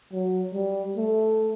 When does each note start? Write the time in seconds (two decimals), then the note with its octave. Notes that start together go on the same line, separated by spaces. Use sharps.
0.12 F#3
0.54 G3
0.96 A3